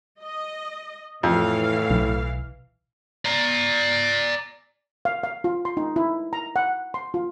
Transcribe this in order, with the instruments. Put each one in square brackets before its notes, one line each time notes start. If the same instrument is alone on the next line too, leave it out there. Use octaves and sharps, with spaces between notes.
[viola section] D#5
[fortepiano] F2 [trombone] A2 [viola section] E3 F5
[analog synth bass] B1
[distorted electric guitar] D5 A#5
[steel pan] F5
F5
F4
C6
D#4
E4
A#5
F#5
C6
F4